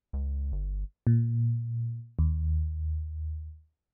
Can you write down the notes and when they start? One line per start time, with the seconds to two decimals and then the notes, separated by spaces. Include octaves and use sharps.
0.13 C#2
0.52 G1
1.07 A#2
2.19 D#2